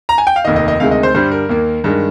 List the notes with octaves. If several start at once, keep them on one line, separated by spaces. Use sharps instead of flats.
A#5
G#5
G5
F5
F1 D#2 D#3 D#5
D#5
D#5
D2 C3 D#3 G#3 F5
D#5
C5
G2 D3 G3 C5
A#4
D#2 D#3 A#3
G2 D#3 G#3